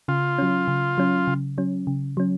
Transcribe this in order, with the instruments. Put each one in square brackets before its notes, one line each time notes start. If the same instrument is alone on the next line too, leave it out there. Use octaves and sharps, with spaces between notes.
[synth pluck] C#3 [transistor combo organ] F4
[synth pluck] F#3 C#4
C#3
F#3 C#4
C#3
F#3 C#4
C#3
F#3 C#4